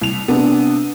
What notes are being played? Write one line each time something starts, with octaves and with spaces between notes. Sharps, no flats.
C2 F7
C3 B3 D4